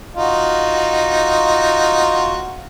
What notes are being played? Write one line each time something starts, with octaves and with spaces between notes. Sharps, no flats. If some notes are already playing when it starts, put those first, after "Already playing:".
D#4 F4 F#4